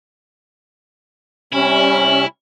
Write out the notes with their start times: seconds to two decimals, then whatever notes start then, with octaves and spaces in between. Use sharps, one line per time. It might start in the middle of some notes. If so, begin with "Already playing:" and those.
1.53 C3 G3 C#4 E4